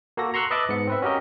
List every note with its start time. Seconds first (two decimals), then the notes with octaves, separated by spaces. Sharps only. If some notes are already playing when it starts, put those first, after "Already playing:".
0.17 A#3 F#4 A4 A#6
0.34 A#5 C6 C#6 E6 F#6
0.50 B4 D#5 E5 A5 D6 F#6
0.69 G#2 B3 C#7
0.87 C4 B4 E5
1.02 C#4 F#4 G4 A#4 D#5